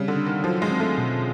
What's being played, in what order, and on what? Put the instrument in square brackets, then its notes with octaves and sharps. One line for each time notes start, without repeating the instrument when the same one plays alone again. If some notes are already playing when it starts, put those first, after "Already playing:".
Already playing: [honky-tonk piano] C#3 [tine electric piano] G3 C4
[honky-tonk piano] D3
[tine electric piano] D4
[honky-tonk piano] D#3
[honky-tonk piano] F3 [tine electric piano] F#3
[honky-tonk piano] G#3
[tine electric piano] C4
[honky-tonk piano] A3
[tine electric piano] B2